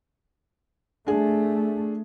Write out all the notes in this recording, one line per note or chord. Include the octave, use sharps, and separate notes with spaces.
A3 D4 G#4